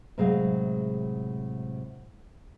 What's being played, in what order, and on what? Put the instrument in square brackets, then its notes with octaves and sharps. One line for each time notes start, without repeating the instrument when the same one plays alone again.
[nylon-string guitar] A2 C3 F#3 G#3 G#4 F5